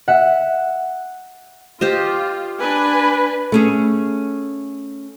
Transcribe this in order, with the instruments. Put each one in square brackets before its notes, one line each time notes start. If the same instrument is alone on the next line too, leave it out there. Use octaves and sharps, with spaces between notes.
[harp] E5 F#5
[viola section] F4 [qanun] G4 C5 D#5
[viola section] D4 B4 G#5
[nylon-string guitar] A3 C#4 G#4